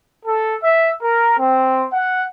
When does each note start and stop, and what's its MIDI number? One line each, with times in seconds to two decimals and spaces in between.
0.24 0.54 69
0.62 0.89 76
1.02 1.33 70
1.37 1.85 60
1.92 2.23 78